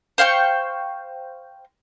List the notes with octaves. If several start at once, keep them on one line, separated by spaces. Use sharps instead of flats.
C5 F5 G5 C#6